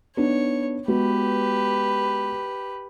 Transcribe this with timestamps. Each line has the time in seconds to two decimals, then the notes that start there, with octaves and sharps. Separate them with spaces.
0.17 B3 D4 D#4 C#5
0.88 G#3 B3 F#4 G4 B4